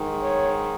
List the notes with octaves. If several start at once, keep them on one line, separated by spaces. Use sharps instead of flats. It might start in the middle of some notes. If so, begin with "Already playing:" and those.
Already playing: G#2 D#3
C#5